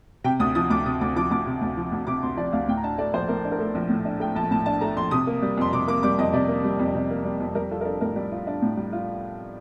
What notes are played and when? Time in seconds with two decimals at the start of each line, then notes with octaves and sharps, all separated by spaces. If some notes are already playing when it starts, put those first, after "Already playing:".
0.24 C3 G5
0.40 D2 D#6
0.55 F3 D#6
0.70 D2 D6
0.86 C3 D#6
1.01 D2 D6
1.16 F3 D6
1.31 D2 D6
1.46 C3
1.61 D2
1.77 F3
1.92 D2
2.07 C3 D6
2.23 D2 C6
2.37 F3 D5
2.53 D2 F5
2.68 A2 G5
2.77 A#5
2.84 D4 A5
2.98 A3 D5
3.14 A#1 C5
3.29 A2 A#4
3.45 D4
3.52 A#4
3.59 A3 A4
3.75 A#1
3.89 A2
4.05 D4
4.20 A3 G5
4.36 A#1 A5
4.51 A2 A5
4.66 D4 A5
4.81 A3 A#5
4.97 A#1 C6
5.11 C3 D#6
5.27 A#3
5.42 G3
5.57 F2 C6
5.73 C3 D6
5.87 A#3 D6
6.03 G3 D6
6.18 F2 D#5
6.33 C3 D5
6.48 A#3
6.64 G3
6.79 F2
6.95 C3
7.10 A#3
7.24 G3
7.40 F2
7.55 G3 A#4
7.71 F4 A4
7.81 A#4
7.85 D4 A4
8.01 A2 A#4
8.16 G3
8.32 F4
8.47 D4
8.62 A2
8.77 G3
8.93 F4